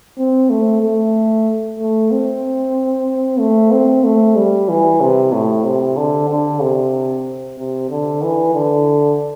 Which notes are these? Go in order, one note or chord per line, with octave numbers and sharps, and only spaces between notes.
C4
A3
A3
A3
C4
A3
C4
A3
G3
E3
C3
A2
C3
D3
D3
C3
C3
D3
E3
D3